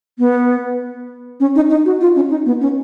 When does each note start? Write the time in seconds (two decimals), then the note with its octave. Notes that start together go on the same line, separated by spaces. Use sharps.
0.19 B3
1.40 C#4
1.55 D#4
1.70 D#4
1.85 F#4
2.01 F4
2.15 C#4
2.30 D#4
2.46 B3
2.61 C#4